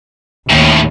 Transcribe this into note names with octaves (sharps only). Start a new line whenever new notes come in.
D#2 A2 C#3